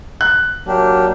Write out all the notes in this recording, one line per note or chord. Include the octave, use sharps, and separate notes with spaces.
F#6
F#3 A#3 D4 G4